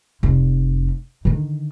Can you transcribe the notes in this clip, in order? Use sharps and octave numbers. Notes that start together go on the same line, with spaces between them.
F1 F4
D3 D#3